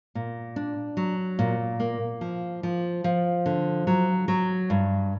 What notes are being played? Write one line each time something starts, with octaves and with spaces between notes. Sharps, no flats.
A#2
D4
F#3
A#2
A#3
F3
F3
F3
D3
F#3
F#3
G2